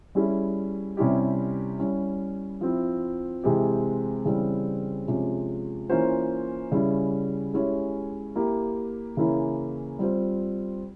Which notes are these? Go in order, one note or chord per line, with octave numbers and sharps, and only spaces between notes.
G3 C#4 E4 G#4
C3 G3 C#4 E4 G4
G3 C#4 E4
F3 C4 E4
C3 E3 G#3 C4 G4
C#3 E3 G3 C4
C3 F3 G#3 C#4 G4
E3 A#3 C#4 F4 C5
C#3 G3 C#4 E4
G#3 C#4 E4 G4 C#5
A#3 E4 G4
C#3 E3 A#3 C#4 E4
G3 C4 F4 C5